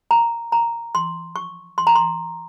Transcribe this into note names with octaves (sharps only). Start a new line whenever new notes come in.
A#5
A#5
C6
C#6
C6
A#5
C6